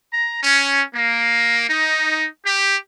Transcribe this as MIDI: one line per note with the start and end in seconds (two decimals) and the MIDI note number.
0.13 0.42 82
0.43 0.82 61
0.95 1.67 58
1.70 2.27 63
2.45 2.76 67